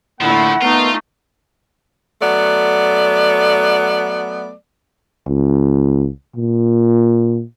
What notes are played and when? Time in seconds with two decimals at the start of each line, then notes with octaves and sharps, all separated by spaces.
0.21 A2 D3 F3 A3 A#3 E4 F#5
0.62 A3 B3 D#4 F4 A#4
2.21 F#3 A3 B3 D5
5.27 C#2
6.36 A#2